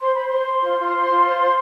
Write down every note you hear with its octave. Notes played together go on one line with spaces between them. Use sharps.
C5 C6
C5 B5
C6
C5
C5
F4
F4
C5
F4
C5
C5